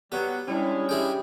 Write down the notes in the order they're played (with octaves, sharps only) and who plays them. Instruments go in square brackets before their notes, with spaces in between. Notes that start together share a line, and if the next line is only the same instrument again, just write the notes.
[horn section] F#3 G3 B3 [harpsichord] G4
[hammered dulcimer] G3 D4 [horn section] G#3 C#4 [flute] E4
[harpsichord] E4 G#4 G5 [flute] G4